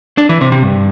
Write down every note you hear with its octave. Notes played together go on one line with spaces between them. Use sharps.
D4
E3
C3
C3
G2